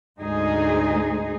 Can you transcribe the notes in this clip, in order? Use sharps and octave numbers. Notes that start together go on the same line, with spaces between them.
D2 G#2 D#4 G#4